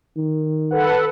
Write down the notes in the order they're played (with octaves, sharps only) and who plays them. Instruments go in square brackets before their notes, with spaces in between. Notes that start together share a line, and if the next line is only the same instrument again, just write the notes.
[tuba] D#3
[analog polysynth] A4 B4 F#5